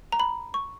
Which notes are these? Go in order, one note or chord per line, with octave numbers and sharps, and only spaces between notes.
A#5
B5
C#6